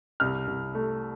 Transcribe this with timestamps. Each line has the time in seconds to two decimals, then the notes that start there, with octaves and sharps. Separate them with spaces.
0.20 C2 F6
0.47 C2
0.75 A3